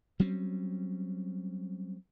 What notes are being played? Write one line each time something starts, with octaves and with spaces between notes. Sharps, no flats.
F#3 G3 C4 C#4